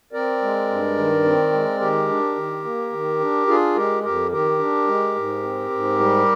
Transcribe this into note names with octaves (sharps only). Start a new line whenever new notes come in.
C4 A#4 D5
G#3
G2
D#3
C4
G#3
D#3 G4 A#4
D4
D#3
A#3
D#3
D4
D4 F4 G#4
G#3 G4 A#4
F2 G4 A#4
D#3 G4 A#4
D4
G#3
G#2
C4
G#2
G3